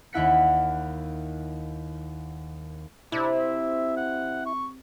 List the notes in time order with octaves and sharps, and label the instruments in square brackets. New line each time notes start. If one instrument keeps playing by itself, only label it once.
[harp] D#2 D#3 E4 F#5 B6 C#7
[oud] C3 [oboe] D4 [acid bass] E4
[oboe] E5
F#5
C#6